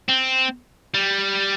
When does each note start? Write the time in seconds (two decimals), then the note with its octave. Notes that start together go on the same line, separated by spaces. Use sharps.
0.08 C4
0.94 G3